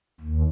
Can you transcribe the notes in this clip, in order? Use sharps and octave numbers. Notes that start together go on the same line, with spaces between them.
D#2